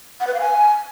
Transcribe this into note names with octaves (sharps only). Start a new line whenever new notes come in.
F#5
B4
F5
G#5